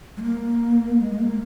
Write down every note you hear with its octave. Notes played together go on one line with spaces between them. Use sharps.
G#3
A#3
G#3
G#3
A#3